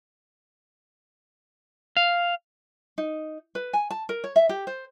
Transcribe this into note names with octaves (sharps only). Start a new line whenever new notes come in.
F5
D#4
B4
G#5
A5
A#4
C#5
E5
G4
C5